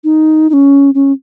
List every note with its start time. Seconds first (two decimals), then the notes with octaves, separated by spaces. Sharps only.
0.04 D#4
0.50 D#4
0.53 C#4
0.94 C#4